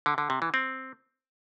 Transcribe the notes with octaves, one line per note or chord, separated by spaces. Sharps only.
D3
D3
C3
E3
C4